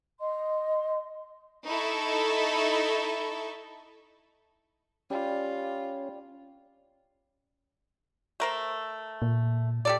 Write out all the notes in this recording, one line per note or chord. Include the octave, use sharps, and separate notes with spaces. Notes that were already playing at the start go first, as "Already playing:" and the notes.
D#5 C6
D#4 E4 A4 C#6
G3 C#4 F4 D6
A3 A#4 C5
A#2
G4 A4 D5